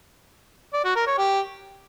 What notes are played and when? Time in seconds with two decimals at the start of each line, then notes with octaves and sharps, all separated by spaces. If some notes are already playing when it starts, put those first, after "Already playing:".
0.73 D5
0.84 F#4
0.96 A#4
1.07 C#5
1.18 G4